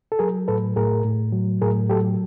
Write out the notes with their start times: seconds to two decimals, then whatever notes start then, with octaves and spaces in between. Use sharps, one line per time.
0.12 A4
0.19 F#3 G#4 A#4
0.48 A2 A4 B4
0.76 A2 G#4 A#4
1.05 A2
1.33 F#3
1.62 A2 G#4 A#4
1.90 F#3 G4 A4